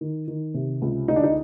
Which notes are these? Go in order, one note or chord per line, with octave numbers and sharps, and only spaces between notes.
D#3
D#3
C3
C#2
D2 D#4
D4
D#4